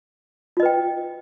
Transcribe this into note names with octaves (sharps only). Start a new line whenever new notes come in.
F4 B4 D#5 G5